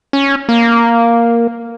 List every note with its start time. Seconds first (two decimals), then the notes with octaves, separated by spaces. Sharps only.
0.13 C#4
0.49 A#3